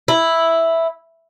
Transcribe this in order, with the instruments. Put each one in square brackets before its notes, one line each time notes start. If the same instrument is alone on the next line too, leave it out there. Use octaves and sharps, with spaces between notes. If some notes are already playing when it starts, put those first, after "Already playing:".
[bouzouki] E4